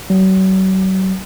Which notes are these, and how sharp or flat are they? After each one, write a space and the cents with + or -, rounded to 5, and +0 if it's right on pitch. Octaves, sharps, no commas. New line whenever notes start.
F#3 +40